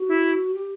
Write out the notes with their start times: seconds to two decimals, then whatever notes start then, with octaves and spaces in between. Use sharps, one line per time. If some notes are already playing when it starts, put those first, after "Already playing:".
Already playing: F#4
0.08 E4
0.54 G4